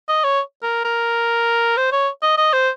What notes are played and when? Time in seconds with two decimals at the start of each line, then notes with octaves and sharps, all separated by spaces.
0.09 D#5
0.24 C#5
0.62 A#4
0.85 A#4
1.77 C5
1.92 C#5
2.22 D#5
2.38 D#5
2.53 C5